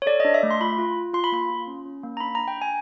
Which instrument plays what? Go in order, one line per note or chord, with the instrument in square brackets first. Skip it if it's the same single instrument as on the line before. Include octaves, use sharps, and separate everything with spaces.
[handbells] C#5
A4 D5
D#5
D4
E5
A3
C6
F4 B5
F4
F4
F4 C6
B5
A#3 C6
F4
C#4
C#4
A#3
A#5
D4 B5
A#5
D4
G5
D4 G#5